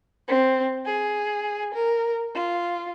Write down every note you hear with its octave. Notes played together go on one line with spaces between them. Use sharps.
C4
G#4
A#4
F4